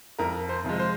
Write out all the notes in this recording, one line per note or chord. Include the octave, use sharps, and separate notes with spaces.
F2 A#4
C5
C3 F3 G#3
C5